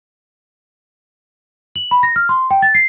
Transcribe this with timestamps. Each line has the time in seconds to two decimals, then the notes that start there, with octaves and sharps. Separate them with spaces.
1.76 F#7
1.91 B5
2.03 A#6
2.16 F6
2.29 C6
2.51 G5
2.62 A6
2.74 C7